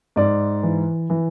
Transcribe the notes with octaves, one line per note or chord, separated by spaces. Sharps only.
G#2 D5
E3
E3